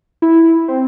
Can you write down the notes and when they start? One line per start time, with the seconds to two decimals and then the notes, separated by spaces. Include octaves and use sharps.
0.22 E4
0.68 C4